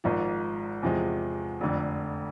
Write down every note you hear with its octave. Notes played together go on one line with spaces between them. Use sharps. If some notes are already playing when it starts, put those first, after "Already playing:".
G#1 G#2 F3
E2 C3 F3 G#3
F1 F2 D3